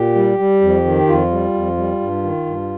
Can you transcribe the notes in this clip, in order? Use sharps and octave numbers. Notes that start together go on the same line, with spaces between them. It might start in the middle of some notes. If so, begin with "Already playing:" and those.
Already playing: A#2 G4
G3
G3
F2
D#3
F2 F4
G3
F2
G3
G2
D#3
G2